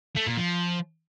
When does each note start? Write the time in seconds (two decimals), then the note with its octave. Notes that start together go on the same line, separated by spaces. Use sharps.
0.17 A3
0.27 A#2
0.37 F3